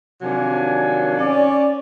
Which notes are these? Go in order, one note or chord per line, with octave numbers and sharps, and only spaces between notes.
C3 D#3 F3 F#3 D4 G#5
C#4 D5